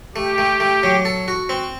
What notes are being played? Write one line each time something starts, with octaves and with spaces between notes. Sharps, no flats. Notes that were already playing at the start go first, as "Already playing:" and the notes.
A3 G4
A3
A3
F#3
A4
F#4
C4